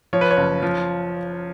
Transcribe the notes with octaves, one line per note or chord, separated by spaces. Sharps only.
F3 C#5
B4
C#5
F#1
F3